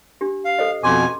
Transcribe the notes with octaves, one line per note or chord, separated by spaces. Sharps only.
D4 G4
F5
A4 C5 D#5
F2 B2 C#4 G#5 C6 D6